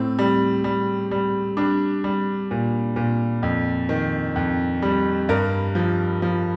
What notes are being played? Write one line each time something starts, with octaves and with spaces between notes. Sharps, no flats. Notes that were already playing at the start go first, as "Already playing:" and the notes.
Already playing: A2 C4
G3
G3
G3
G3 D4
G3
A#2
A#2
F2
D#3
F2
G3
G2 A#4
F3
F3